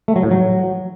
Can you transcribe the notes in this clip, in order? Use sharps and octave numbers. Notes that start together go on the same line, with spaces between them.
A3
F#3
A2
F#3